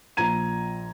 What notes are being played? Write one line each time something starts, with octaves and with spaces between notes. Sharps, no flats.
A#1 F3 A#5 G#6 D#7